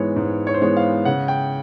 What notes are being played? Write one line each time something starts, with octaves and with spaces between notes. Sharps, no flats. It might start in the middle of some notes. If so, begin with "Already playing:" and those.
Already playing: G#2 E3 G#3 B3 C#5
G#2
C#5
C5
E3 G#3 B3 C#5
F5
C#3 F#5
G5